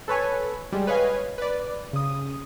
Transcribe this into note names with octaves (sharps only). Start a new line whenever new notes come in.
A4 B4 C#5 G#5
G3 G#3
B4 C#5 D#5 F5 G#5
B4 D5
C#3 D#6